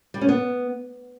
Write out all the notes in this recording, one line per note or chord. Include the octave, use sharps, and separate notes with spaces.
G3
C#4
B3